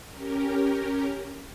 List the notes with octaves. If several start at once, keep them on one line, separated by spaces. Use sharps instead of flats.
C#4 G4 A#4